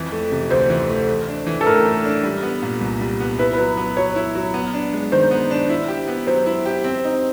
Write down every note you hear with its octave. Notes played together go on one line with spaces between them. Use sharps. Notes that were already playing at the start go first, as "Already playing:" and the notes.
Already playing: F2 E3
A3
C3
D2 C5
E3
A3
A3
D4
E3
A4
A2 A#4
A3
D4
G3
B3
A#2
C2
G3
B3
E4 B4
B4
F#3
B3
F#3 C#5
E4
F#3
B3
D4
G#3
D#3 C5
B3
D4
E4
G4
B3
F#3 C5
E4
G4
C4
D#4